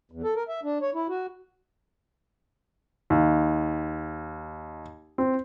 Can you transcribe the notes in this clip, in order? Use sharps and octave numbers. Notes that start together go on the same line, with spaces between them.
E2
A4
A#4
E5
D4
C#5
E4
F#4
D#2
C4